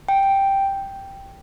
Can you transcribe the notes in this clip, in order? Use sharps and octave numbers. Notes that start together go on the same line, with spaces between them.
G5
G5